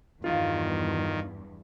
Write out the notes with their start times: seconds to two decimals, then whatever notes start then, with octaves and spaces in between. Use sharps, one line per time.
0.24 E2 G2 D#3 F4 F5